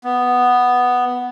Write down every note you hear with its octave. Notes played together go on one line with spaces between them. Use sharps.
B3